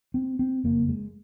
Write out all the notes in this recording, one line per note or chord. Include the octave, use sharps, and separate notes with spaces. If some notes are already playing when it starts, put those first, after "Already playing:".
C4
C4
F#1 F2 C#3 A#3
G#3